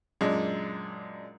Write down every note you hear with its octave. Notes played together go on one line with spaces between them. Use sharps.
F#2 A#2 G#3 D4